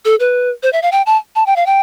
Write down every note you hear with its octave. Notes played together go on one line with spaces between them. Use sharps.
A4
B4
C5
E5
F5
G5
A5
A5
G5
F5
G5